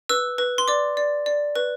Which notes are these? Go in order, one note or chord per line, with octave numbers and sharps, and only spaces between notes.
B4 E6
B4
C6
D5 D6
D5
D5
B4